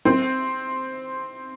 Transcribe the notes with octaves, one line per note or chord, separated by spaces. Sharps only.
C4